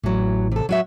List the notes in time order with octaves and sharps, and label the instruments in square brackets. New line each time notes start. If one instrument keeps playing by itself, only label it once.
[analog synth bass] A1 [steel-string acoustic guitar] E3 F#3
[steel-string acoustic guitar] C3 A4
F#3 F#4 E5